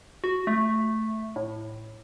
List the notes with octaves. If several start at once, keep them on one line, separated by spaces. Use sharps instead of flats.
F#4
A3
A2